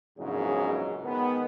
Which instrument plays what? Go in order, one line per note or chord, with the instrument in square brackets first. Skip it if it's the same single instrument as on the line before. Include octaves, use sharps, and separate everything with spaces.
[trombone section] A#1 E2 G#2 C#3 F#3
D#3 G#3 B3